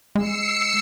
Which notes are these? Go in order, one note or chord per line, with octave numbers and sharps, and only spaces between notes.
G#3 E6 C7 C#7